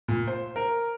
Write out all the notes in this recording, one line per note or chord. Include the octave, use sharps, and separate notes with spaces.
A#2
C5
A#4